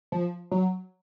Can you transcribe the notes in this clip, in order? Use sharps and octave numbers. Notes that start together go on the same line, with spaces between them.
F3
F#3